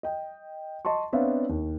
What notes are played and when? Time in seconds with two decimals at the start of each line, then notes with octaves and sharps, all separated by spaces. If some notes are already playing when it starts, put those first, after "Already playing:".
0.03 D#5 G5
0.85 D#5 A5 C6 C#6
1.13 B3 C4 D4 C#5 E5 F5
1.49 D#2